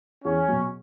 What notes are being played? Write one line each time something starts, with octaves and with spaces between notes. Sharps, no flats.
E2 C#4
B2 F#3